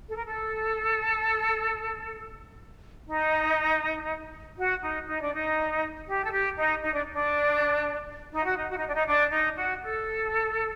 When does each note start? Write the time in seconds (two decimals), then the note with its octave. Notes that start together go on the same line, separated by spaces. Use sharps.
0.08 A4
0.17 A#4
0.26 A4
3.08 D#4
4.58 F#4
4.82 D#4
5.07 D#4
5.21 D4
5.34 D#4
6.07 G4
6.25 A4
6.32 G4
6.57 D#4
6.82 D#4
6.92 D4
7.12 D4
8.32 D#4
8.45 F#4
8.57 D#4
8.69 F#4
8.78 D#4
8.87 D4
8.95 D#4
9.07 D4
9.32 D#4
9.56 F#4
9.82 A4